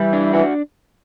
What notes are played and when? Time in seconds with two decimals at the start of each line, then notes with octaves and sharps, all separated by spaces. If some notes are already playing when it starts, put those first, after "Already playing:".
Already playing: E3 G3
0.13 D4
0.33 E3 F#4